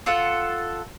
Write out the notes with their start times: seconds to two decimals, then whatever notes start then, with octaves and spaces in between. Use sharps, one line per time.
0.06 F4 A4 F#5